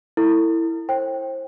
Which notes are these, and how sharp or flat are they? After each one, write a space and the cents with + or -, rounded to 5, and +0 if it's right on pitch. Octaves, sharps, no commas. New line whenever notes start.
E4 +0 A4 +35
C5 +35 G5 +0